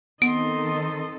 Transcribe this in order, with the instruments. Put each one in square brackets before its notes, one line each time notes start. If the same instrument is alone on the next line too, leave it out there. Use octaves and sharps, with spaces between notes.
[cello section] D#3 C4 A4 [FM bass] B3 [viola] D#5 C6 [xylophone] D7